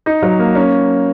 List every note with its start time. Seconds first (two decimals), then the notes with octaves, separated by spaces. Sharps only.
0.06 D#4
0.22 F#3
0.39 A#3
0.55 C#4